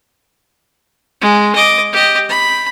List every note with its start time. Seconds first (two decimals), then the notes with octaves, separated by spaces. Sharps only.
1.22 G#3
1.55 D#5 D6
1.93 G4 D#5
2.29 B5